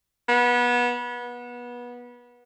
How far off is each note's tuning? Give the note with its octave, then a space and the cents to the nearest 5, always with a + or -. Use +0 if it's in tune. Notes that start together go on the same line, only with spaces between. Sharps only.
B3 -25
B3 -25